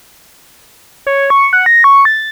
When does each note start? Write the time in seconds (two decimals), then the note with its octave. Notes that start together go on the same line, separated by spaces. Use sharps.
1.07 C#5
1.30 C#6
1.53 F#5
1.66 A#6
1.84 C#6
2.05 A6